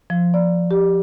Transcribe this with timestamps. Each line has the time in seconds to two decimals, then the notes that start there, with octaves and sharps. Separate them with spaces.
0.10 F3
0.34 D5
0.71 G4